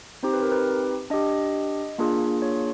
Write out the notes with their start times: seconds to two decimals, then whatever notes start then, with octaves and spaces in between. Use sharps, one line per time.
0.23 C4 D#4 G4 C5
0.33 B4
0.43 A#4
0.52 B4
1.10 D4 G4 D#5
1.98 A#3 D4 F4 G#4
2.42 C#5